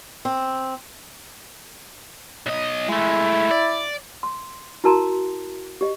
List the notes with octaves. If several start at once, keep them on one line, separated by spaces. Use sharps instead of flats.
C4
B1 D#5
G#3 A3 E4
D5
C6
E4 F#4 A#4 A5 A#5 C6
G4 D#5